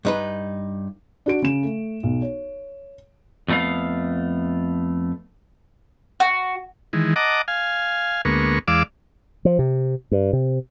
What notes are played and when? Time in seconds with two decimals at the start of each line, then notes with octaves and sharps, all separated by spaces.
0.05 G2 D#4 B4
1.26 D4 F#4 D7
1.42 C#3 E7
1.63 A3
2.03 B1
2.22 C#5
3.48 F2 A2 A3 B3 F5
6.20 F#4
6.93 D#3 E3 G#3
7.16 D#5 F#5 A5 A#5 D6
7.48 F5 G#5
8.25 D2 G#3 A#3 B3 C#6
8.68 E2 G#3 D5 F5 D6 E6
9.45 F3
9.59 C3
10.12 G2
10.33 C3